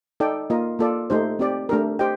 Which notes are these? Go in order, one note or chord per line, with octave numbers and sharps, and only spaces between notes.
D#4 A4 D5 G5
A#3 F4 A#4 D#5
A#3 F4 A4 D5
A3 D#4 G4 C5
C4 G4 D5
A3 D4 G4 A#4
G4 C5 D#5 G5